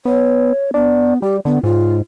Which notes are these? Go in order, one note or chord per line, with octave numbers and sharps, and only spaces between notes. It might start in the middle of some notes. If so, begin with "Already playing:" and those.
B3 C#5
B3 D4
G3 G4
D3 B3
G#2 F4